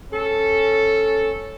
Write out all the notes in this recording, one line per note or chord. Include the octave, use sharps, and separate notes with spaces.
C#4 A4